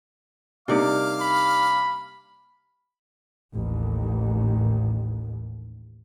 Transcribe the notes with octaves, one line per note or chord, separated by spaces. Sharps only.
C3 G3 A#3 D4 D#4 D5 F5 D6
B5
A1 D#2